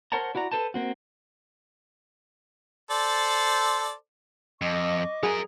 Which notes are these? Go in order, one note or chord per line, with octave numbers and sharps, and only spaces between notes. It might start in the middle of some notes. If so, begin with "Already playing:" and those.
A#4 C5 C#5 F#5 A5 A#5
E4 F#4 D5 A#5
A4 B4 C5 A5
A#3 C4 F#4
A4 C5 D5
F2 D#5 C#6 D6
F#3 G#4 A#4